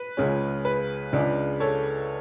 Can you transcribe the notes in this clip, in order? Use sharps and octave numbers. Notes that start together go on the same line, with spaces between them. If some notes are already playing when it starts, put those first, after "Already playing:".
Already playing: B4
C#2 C#3 G#3 C#4
B4
C#2 C#3 G#3 D4
A4 C#5